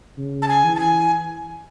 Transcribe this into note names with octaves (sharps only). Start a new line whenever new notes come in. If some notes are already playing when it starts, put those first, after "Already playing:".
C#3
A5
G#5
E3
A5
G#5